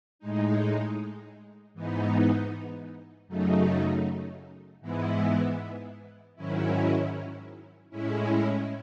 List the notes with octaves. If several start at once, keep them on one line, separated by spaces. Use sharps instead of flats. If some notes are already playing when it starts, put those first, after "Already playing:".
A2 G#3 D#4
G#2 E3 B3 D#4
F#2 C#3 F#3 A3 D#4
G#2 E3 G#3 B3 E4
G#2 D#3 F#3 C#4 E4
A2 G#3 C#4 E4